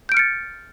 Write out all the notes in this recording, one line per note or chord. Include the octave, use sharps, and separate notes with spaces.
F6 G6 A6 C#7 D7